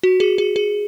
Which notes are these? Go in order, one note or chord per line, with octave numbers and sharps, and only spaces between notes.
F#4
G#4
G#4
G#4